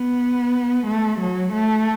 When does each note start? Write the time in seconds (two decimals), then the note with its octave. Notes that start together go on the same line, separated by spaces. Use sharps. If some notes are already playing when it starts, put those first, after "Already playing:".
Already playing: B3
0.87 A3
1.20 F#3
1.53 A3